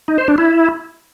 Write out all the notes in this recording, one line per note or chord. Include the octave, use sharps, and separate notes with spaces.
D#4
C5
D4
E4